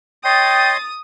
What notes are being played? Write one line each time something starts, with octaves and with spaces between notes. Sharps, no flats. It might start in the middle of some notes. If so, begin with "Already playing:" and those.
C#5 D#5 G5 C6 D#6 A6